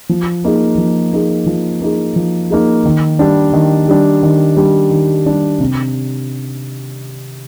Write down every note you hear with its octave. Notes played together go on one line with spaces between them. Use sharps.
F3
A#3 D#4 G#4
F3
A#3 D#4 G#4
F3
A#3 D#4 G#4
F3
A#3 D#4 G#4
D#3
G3 D4
D#3
G3 D4
D#3
G3 D4
D#3
G3 D4
C3